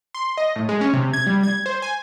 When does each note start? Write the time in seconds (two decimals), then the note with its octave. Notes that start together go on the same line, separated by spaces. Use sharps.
0.14 C6
0.37 D#5
0.56 A2
0.69 G#3
0.81 C#4
0.93 C3
1.14 G#6
1.27 G3
1.43 G#6
1.66 C5
1.82 G#5